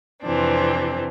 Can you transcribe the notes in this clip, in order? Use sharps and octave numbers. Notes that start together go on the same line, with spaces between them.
F2 C3 E3 C4 D4